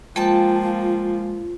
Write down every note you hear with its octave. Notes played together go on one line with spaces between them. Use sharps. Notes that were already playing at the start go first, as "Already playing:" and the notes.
F3 G#3 A#3 F4 G5 A5